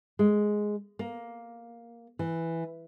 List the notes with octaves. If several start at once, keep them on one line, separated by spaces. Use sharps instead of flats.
G#3
A#3
E3